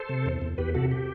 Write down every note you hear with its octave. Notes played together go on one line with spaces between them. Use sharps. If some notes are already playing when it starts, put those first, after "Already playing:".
Already playing: A4 C5
C3
E2
E2
E2 G4 B4
C3 F#4 A4
G4